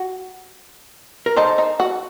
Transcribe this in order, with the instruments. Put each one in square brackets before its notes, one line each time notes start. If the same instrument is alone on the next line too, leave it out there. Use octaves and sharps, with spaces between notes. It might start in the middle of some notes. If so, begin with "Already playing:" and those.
Already playing: [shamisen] F#4
[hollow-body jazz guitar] A#4
[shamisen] D#4 [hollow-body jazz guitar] A4 C5
[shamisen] D#4
F#4